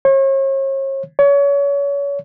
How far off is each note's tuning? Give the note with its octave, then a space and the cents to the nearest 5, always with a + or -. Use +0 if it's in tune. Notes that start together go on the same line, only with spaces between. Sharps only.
C#5 -40
C#5 +30